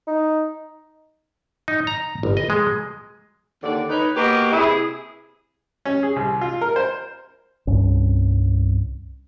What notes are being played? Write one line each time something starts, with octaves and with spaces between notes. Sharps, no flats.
D#4
D#4
A#5
G1
D#5
G#3
D#2 D3 D5
D#4 B4 C#5
A#3 B3 F#4 G4 B4 D#5
C3 E4 G#4
C#4
G#4
C2
F4
A#4
C5
C2 G2 C#4